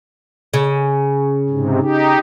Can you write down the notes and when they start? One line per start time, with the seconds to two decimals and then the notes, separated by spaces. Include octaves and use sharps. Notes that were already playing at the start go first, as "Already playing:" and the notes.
0.54 C#3
1.49 G#2 C3
1.81 D#4 G4